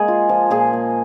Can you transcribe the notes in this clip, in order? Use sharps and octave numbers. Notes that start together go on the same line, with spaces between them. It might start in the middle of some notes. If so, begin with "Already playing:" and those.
Already playing: G#3 A#3 G#4
F4
F3
A#2 G#4
A#3